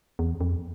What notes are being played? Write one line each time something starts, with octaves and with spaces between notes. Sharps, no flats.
E2
F2